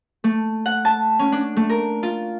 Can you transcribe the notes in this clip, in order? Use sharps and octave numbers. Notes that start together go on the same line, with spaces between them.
A3
F#5
A5
C#4
D4
A3
A#4
F4